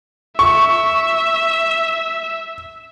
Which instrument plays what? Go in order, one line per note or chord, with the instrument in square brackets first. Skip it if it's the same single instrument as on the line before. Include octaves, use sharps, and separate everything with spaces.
[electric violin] E5 [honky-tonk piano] C#6